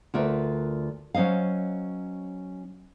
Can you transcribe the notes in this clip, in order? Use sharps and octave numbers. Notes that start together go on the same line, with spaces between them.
D2 F4 A#4 B4 E5
F#3 C#4 C5 D#5 F5